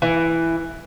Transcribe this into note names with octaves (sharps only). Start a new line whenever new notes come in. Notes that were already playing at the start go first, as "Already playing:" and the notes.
E3